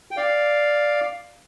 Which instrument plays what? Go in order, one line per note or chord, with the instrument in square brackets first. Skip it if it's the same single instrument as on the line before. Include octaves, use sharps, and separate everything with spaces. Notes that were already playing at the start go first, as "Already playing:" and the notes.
[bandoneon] G5
D5 F5